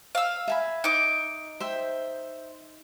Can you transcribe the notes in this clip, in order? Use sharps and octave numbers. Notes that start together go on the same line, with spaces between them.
F5 E6
E5 G#5 B5
D#4 D6
C5 E5 G5